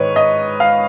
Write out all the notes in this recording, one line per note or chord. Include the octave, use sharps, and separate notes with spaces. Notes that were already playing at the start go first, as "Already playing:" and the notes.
Already playing: G#2 D#3 B4 C#5
D#5
F5